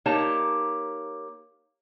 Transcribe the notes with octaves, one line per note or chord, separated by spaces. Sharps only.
A#3 D#4 G4 C#5 A5